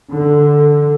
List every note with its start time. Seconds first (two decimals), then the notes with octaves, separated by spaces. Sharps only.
0.12 D3